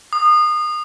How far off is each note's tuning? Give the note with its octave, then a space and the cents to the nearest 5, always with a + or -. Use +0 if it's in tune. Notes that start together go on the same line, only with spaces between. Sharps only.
D#6 -30